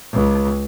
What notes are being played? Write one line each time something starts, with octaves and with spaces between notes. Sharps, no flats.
C#2